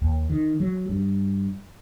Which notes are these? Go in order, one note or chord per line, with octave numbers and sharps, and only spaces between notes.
D#2
D#3
F#3
G2